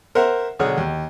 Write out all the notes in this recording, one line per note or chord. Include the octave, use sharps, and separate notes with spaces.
A#4 C5 E5 F#5
B1 D3 G#4 C#5 F#5 F6
D#2